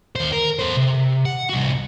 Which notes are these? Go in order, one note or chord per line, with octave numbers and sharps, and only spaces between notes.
D#2 C5
A#4
A4 C5
C3
F#5
C2 F#4